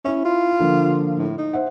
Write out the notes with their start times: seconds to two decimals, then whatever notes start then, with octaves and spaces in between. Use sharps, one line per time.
0.05 C#4 E4 E5
0.25 F4
0.60 D3 F3 A#3
1.18 A2
1.38 D#4
1.53 C5 E5 F#5